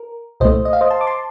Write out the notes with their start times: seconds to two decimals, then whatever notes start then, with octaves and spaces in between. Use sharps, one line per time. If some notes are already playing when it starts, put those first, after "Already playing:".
Already playing: A#4
0.40 C2 A#2 A3 C5 D#5
0.65 D#5
0.73 F5
0.81 C5 D#5
0.90 A5 C6
1.01 D6
1.07 A5 C6